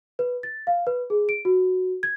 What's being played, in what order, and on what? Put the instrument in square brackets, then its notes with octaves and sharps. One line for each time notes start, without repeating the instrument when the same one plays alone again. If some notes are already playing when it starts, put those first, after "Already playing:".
[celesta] B4
A6
F5
B4
G#4
D7
F#4
G#6